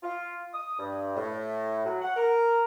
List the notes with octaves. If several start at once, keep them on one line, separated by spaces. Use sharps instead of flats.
F4
D#6
G2
A2
F#3
F#5
A#4